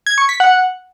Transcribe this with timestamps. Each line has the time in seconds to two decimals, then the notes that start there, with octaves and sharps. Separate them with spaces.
0.06 G#6
0.18 C#6
0.29 B6
0.40 F#5